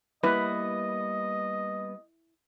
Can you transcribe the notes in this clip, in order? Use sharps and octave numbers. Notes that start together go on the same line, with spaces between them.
G3 A#3 B3 E4 B4 D#5